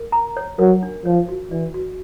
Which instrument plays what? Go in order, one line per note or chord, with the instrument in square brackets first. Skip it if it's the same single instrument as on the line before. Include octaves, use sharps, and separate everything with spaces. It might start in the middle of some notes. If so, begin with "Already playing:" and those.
Already playing: [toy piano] A#4
A#5
C#5
[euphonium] F#3 [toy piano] A#4
[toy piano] D4
[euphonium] F3 [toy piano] C#5
[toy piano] F#4
[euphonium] E3 [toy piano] D5
[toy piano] F#4